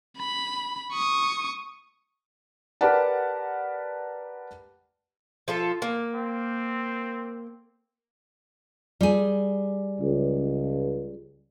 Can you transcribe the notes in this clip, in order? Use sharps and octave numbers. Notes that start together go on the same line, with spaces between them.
B5
C#6 D#6
G4 A#4 B4 D5 F#5 A5
F3 F4 A4
A#3
C4
G3 G#4
C#2